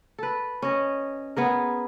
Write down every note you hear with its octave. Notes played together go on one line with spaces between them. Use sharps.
A4 B4
C#4 D#5
B3 G#4 A#4